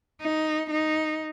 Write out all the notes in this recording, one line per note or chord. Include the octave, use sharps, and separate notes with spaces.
D#4
D#4